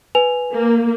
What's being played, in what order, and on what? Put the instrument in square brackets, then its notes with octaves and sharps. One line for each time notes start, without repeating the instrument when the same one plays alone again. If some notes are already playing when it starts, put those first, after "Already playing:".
[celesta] B4 G#5 F7
[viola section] A#3